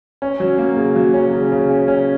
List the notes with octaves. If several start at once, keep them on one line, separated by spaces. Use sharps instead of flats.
C#4
F#3
A#3
C#3
F#3
C#4
C#3
C#3
C#4
C#4